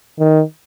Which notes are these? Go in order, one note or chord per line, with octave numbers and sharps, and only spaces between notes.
D#3